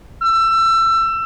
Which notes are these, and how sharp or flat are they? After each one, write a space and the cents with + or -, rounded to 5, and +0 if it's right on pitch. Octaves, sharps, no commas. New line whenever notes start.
E6 +25